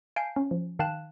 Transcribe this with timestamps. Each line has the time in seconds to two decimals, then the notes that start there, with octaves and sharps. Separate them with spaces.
0.16 F5 G#5 A5 G6 C7 D7
0.36 C#4
0.51 F3
0.79 D#3 F5 G5 A5 F#6 E7